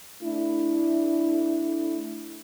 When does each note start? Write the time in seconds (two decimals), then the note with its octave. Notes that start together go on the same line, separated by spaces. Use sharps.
0.23 A3 D4 E4